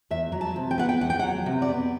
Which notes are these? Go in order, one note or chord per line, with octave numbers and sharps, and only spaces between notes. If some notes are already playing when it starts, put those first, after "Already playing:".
E2 E5
F#3
A5
C3
G5
B3 F#5
G5
E2 F#5
G5
F#5
F#3
C3
D5
B3